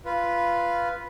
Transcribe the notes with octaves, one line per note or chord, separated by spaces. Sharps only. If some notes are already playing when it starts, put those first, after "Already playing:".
F4 B4